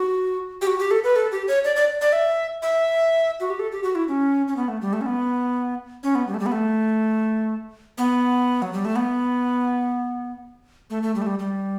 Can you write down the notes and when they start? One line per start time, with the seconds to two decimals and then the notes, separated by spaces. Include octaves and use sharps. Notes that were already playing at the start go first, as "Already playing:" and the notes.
Already playing: F#4
0.62 G4
0.67 F#4
0.79 G4
0.91 A4
1.04 B4
1.16 A4
1.32 G4
1.48 C#5
1.65 D5
1.76 D5
2.01 D5
2.13 E5
2.62 E5
3.40 F#4
3.50 G4
3.59 A4
3.72 G4
3.84 F#4
3.95 E4
4.08 C#4
4.48 C#4
4.57 B3
4.68 A3
4.81 G3
4.93 A3
5.01 C#4
5.06 B3
6.03 C#4
6.15 B3
6.28 G3
6.34 A3
6.40 G3
6.46 B3
6.52 A3
7.98 B3
8.62 F#3
8.73 G3
8.85 A3
8.96 B3
10.90 A3
11.03 A3
11.15 G3
11.22 A3
11.26 G3
11.39 G3